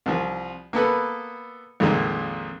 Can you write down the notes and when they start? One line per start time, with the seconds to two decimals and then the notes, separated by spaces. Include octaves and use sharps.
0.06 C2 F3
0.73 A#3 B3 A4 B4
1.80 A#1 F2 A#2 D#3 G#3 A#3